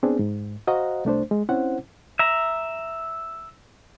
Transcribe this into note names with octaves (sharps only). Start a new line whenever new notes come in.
B3 C4 D4 G#4
G#2
F#4 C5 D#5 F5 F#5 A#5
C2 A3 D4 C5
G#3
C4 C#4 E4 C5 F#5
E5 A#5